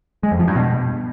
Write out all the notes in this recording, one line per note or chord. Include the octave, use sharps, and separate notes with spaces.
G#3
F2
F3
G2
B2